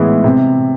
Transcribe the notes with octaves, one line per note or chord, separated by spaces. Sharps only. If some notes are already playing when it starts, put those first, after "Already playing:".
Already playing: A2 E3 G#3 B3
C3